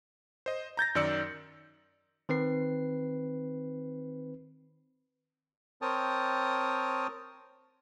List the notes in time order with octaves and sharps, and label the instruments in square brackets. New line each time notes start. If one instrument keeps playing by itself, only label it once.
[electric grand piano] C5 D#5
A#5 G6 A6 A#6
F#2 D#3 D5 E6 C#7
[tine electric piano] D#3 C4 B4 C7
[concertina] C4 A#4 C#5 G5 A5 D#6